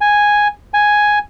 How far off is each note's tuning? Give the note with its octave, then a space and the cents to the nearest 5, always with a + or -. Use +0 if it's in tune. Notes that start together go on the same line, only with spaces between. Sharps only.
G#5 -5
G#5 +0